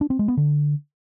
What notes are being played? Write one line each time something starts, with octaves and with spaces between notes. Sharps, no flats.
D4
C4
G#3
B3
D3